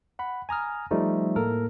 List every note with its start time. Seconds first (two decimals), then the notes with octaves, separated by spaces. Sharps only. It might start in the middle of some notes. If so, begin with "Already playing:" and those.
0.19 F#5 B5
0.49 G#5 A#5 D#6 F6
0.91 F3 G3 A3 D#4
1.36 A2 A#3 A4 A#4